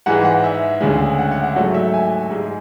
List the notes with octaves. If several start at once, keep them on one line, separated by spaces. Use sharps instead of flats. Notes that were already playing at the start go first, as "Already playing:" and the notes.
G#2 E3 G#3 F#5
F#5
E5
D2 C#3 G#3
F#5
F#5
F#5
G#2 F#3 A3 F#5
E5
G#5
G#2 G#3